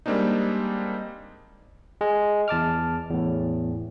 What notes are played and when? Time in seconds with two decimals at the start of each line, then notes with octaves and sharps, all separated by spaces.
0.06 G3 G#3 A#3 C4 D4 D#4
2.01 G#3
2.48 E2 A5 D6 F6
3.10 E2 A2